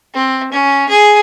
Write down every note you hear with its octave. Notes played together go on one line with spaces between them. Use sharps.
C4
C#4
G#4